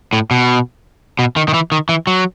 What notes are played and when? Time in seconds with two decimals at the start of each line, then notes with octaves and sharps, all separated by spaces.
0.13 A2
0.31 B2
1.19 B2
1.36 D#3
1.48 D#3
1.54 E3
1.72 D#3
1.89 E3
2.07 F#3